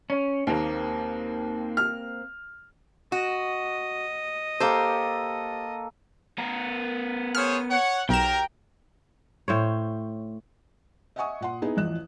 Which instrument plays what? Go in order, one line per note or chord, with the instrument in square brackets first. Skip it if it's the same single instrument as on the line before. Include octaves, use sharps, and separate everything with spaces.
[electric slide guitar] C#4
[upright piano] D#2 [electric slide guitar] A#3 C4
[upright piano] F6
[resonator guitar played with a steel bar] F#4 [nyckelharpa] D#5
[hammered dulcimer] A#3 A4 [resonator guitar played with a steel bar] G4 C5
[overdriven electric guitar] B3 A#4
[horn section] G#4 C5 C#5 [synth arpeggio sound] F6
[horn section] C#5 F#5
[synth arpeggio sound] B1 E7 [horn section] F#3 G4 A#4 [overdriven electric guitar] G5
[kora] A2 C5 C#5
[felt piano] D#5 E5 F#5 G#5 C#6 D#6
A#2 F#5 C6
B3 D#4 E4 G#4
A1 E2 F3 D#5 F#6 E7